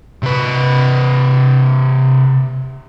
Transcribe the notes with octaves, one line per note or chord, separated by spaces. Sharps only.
C3 B4